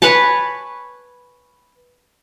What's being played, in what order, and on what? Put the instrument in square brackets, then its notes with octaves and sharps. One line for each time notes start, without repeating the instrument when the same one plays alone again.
[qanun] B4 C#5 G#5 A5